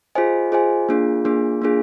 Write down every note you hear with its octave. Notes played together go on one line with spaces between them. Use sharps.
F4 G#4 C5 D#5 G#5
F4 G#4 C5 D#5 G#5
A#3 D4 F4 G#4
A#3 D4 F4 G#4
A#3 D4 F4 G#4